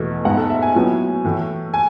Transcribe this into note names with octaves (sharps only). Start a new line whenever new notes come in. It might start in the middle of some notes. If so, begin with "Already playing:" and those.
Already playing: E2 B2 A3
G#2 G#3 B3 F#5
A4
E5
G#5
A2 F#3 B3
A2 E3 A3
G#5